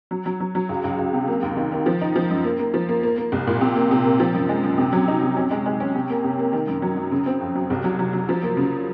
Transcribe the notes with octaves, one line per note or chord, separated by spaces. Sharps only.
F#3
F#3
F#3
F#3
C#2
C#2
C#2
C3
A#3
D#2
D#3
D#3
F3
D#4
F3
F#2
A#3
A#3
F3
A#3
A#3
A#3
C2
A#2
C3
A#3
C3
A#3
F3
F#2
G#3
F#2
C3
F#3
D#4
C3
C#4
G#3
G#3
C#4
C3
A#3
C3
A#3
D#3
F#2
F#3
F#2
C#3
C4
F2
F#3
C2
F#3
F#3
F#3
F3
A#3
C#3